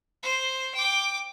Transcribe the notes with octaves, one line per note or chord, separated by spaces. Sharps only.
C5
G5 D6